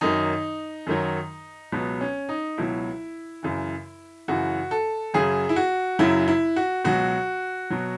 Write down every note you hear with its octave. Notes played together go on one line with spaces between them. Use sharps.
F#2 D#3 F#3 D#4
F#2 D#3 F#3
C#2 B2 F#3 B3
C#4
D#4
C#2 B2 F#3 E4
F#2 C#3 E3
F#2 C#3 E3 F#4
A4
F#2 C#3 F#3 G#4
E4
F#4
F#2 C#3 F#3 E4
E4
F#4
C#2 B2 F#3 F#4
B2 F#3